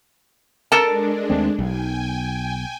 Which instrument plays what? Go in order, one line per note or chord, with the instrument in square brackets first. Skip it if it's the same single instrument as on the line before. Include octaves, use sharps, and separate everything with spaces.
[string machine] G#3 D4 [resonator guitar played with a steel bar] A4 A#4 A5
[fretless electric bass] D#2 A3 C4
[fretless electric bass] B1 [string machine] G5 G#5